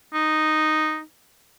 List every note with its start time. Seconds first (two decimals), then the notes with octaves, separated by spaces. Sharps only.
0.14 D#4